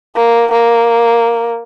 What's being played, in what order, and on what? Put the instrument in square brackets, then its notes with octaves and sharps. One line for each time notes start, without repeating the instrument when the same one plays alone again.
[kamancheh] A#3
A#3